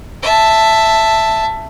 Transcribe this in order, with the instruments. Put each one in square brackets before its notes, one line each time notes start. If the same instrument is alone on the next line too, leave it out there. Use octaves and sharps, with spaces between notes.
[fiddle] E5 A5